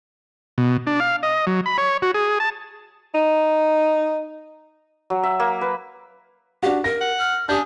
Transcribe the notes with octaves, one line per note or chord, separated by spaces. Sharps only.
B2
D4
F5
D#5
F#3
B5
C#5
F#4
G#4
A5
D#4
F#3
E5
A#3
B4
D4 F#4 G4
A#4 A#6
F#5
F6
D4 G4 G#5 D#6 G6